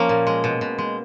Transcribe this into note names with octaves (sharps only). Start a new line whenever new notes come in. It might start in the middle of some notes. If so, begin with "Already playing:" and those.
Already playing: F3 A#3 C#4
A#2
G#3
B2
B2
G#3